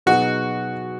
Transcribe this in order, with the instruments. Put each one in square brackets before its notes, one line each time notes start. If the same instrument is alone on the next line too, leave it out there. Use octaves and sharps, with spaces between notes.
[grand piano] B2 F#3 B3 D#4 G#4 [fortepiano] F#4